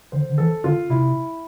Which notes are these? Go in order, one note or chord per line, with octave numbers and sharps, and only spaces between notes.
D3 C5
D3
E3 A4
D3 F4
C3 E4